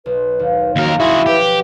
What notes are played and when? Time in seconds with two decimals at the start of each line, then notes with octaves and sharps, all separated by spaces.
0.06 B1 B4
0.39 D#2
0.76 D#2 F3 C#4 F#4 A#4
1.00 E4 F#4 G#4 C6
1.26 G4 B4